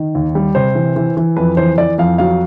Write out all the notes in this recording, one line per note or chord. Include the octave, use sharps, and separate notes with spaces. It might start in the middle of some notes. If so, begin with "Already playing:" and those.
Already playing: D#3
D#2
G3
C3 C5
E3
E3
E3
F2 B4
E3 C5
E3 D5
F2 F5
F#3 F5